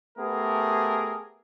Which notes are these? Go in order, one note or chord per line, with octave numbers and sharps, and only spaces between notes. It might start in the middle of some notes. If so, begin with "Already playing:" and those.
A3 B3 G4 G#4 A#4